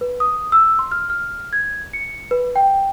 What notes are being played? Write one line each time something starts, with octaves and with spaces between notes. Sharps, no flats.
B4
D#6
E6
C6
F6
F6
G#6
C#7
B4
G5